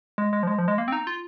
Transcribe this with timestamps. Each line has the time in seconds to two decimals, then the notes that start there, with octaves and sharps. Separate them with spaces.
0.18 G#3
0.33 G#3
0.43 F3
0.47 G#3
0.58 F3
0.68 G#3
0.78 A#3
0.88 C4
0.92 D#4
1.07 F4